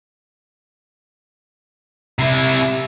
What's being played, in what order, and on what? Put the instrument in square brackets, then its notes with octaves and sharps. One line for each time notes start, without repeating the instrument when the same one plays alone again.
[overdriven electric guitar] C3 E4